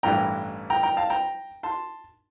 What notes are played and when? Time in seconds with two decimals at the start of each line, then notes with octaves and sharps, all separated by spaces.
0.03 A1 G2 E3 G5 A#5
0.70 G5 A#5
0.83 G5 A#5
0.97 F5 A5
1.10 G5 A#5
1.63 A5 C6